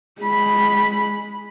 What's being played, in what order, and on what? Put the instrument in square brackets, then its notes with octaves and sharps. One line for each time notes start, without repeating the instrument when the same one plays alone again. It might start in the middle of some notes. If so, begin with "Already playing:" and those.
[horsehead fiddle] G#3 B5